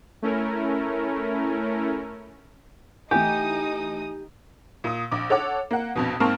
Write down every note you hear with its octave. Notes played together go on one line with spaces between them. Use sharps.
A3 C#4 E4 A#4
E3 A3 D#4 G4 G#5 D#6
A#2 D#6
A#1 D6
A4 C#5 F#5 D6
A#3 F#5
A#1 F2 B2
G#2 A#3 C4 A5 C#6 F6